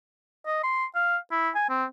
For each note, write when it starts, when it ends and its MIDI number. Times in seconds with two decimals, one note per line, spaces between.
0.46 0.60 75
0.63 0.85 84
0.95 1.17 77
1.31 1.50 64
1.55 1.66 80
1.69 1.85 60